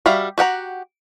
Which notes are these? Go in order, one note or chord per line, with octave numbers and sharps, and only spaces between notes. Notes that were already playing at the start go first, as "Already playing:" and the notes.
G3 F#4 E5 F5
F#4 G4 F#5 A#5